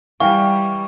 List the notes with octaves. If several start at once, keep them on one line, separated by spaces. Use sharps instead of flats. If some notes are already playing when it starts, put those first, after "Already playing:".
E3 G3 F5 G5 C#6